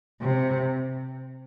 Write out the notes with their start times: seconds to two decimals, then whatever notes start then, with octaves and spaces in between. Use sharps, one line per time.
0.21 C3